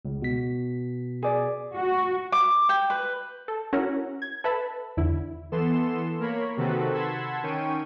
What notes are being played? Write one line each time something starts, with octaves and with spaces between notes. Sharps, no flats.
C#2
B2 B6
G#4 D5
F#4
D6
G5
B4
A4
C#4 E4 F#4 A#4 F#5
G#6
A4 B4 E5 A5 B5
E2 D3 E4
E3 B3 A4 C6 E7
A#3 A#4 C#5 B5
C3 D#3 C4 F#4 A4 B4
F#5 A5 B5 C6 E6 G#6
D#3 C#4 G5 C#6 D#7